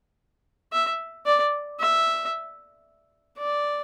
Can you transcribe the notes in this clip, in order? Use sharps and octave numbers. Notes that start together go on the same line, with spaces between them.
E5
D5
E5
D5